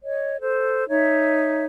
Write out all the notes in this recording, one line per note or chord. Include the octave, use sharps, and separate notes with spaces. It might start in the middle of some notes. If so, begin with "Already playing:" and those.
C#5 D#5
A4 C5
D#4 C#5 E5